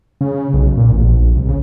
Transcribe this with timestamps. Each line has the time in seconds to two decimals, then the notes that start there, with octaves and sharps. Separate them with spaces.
0.21 C#3
0.54 B1
0.77 A#2
0.92 A1
1.04 A#1
1.36 C2
1.49 C#3